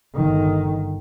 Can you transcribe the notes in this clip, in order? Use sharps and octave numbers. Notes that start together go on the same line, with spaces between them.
G1 D#3